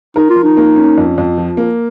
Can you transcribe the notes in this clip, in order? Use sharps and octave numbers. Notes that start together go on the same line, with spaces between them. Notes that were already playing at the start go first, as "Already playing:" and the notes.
D#4 A#4
F4
F3
D#4
A#3
C#4
F2
F2
F3
A#3